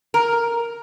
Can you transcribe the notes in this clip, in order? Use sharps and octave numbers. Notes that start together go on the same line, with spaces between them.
A#4